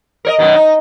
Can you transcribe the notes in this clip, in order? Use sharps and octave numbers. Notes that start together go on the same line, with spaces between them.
A#4 C#5 D#5
F#2 B2 D#3
D#4